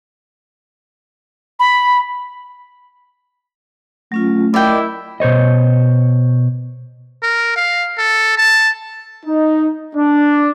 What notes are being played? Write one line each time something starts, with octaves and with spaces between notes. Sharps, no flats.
B5
F#3 A3 C#4 F4
E4 A#4 D5 D#5 G5
B2 C5 C#5 D#5
A#4
F5
A4
A5
D#4
D4